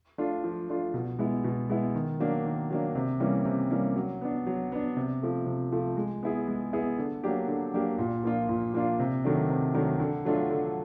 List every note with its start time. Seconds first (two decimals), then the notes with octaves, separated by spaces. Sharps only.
0.18 A3 D4 F4
0.44 F3
0.69 A3 D4 F4
0.94 B2
1.19 G#3 B3 E4
1.44 B2
1.70 G#3 B3 E4
1.95 D#3
2.20 F#3 A#3 D4
2.45 D#3
2.71 F#3 A#3 D4
2.95 C3
3.20 E3 G3 A#3 C#4
3.45 C3
3.71 E3 G3 A#3 C#4
3.96 F#3
4.21 B3 D4
4.47 F#3
4.72 B3 D4
4.97 C3
5.22 F3 A3
5.46 C3
5.72 F3 A3
5.97 G#3
6.23 B3 E4 G#4
6.47 G#3
6.73 B3 E4 G#4
6.98 D3
7.24 F#3 A#3 D4 G4
7.48 D3
7.74 F#3 A#3 D4 G4
7.99 A#2
8.24 F3 A#3 D4 F4
8.49 A#2
8.74 F3 A#3 D4 F4
9.00 C3
9.24 D#3 F#3 A3 D4
9.49 C3
9.74 D#3 F#3 A3 D4
10.00 D3
10.25 F#3 A3 D4 F4
10.50 D3